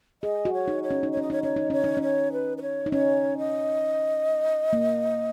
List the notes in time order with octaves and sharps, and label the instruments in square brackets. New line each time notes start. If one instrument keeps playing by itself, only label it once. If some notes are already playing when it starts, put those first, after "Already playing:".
[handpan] G#4 [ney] D#5
[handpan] F#4
[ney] C#5
[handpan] D#4
[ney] C#5
[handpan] C#4
D#4
[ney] C#5
[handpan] C#4 [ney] D#5
[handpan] D#4 [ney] C#5
[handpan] C#4 [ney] C#5
[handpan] D#4
[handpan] C#4 [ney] C#5
[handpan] D#4
C#4
[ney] C#5
B4
B4
C#5
[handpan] D#4
[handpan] C#4 [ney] C#5
[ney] D#5
[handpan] A#3